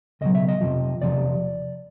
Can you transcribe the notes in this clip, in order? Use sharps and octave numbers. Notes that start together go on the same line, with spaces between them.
C#2 B2 F#3 D#5
E5
D#5
F2 C3 F3
E2 C3 F3 D5